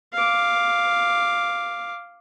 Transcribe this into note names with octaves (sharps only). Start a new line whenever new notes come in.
F5 D6